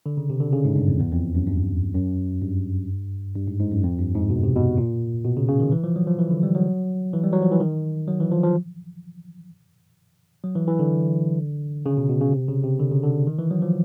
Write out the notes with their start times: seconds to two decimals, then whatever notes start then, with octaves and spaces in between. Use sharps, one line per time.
0.06 D3
0.17 C#3
0.30 C3
0.41 D3
0.53 C#3
0.65 G#2
0.76 G2
0.88 F2
1.00 E2
1.12 F2
1.35 F#2
1.47 G2
1.94 F#2
2.42 G2
3.36 G2
3.48 G#2
3.60 G#2
3.71 F#2
3.83 F2
3.98 G2
4.15 G#2
4.30 B2
4.43 C3
4.56 B2
4.77 A#2
5.25 B2
5.37 C#3
5.48 C#3
5.60 D#3
5.72 E3
5.84 F3
5.96 F#3
6.07 F3
6.19 E3
6.31 D3
6.43 G3
6.55 F#3
7.13 E3
7.24 G3
7.33 F#3
7.42 F3
7.52 E3
7.61 D#3
8.08 F#3
8.20 E3
8.31 F3
8.43 F3
10.44 F#3
10.55 E3
10.68 E3
10.79 D3
11.86 C#3
11.97 B2
12.09 B2
12.21 C#3
12.32 C3
12.48 C#3
12.64 C3
12.80 D3
12.91 C#3
13.03 D3
13.27 D#3
13.39 E3
13.51 F#3
13.62 F3